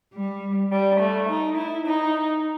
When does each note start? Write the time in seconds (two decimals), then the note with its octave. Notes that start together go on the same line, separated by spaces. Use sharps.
0.13 G3
0.72 G3
1.00 A3
1.29 D#4
1.57 E4
1.86 D#4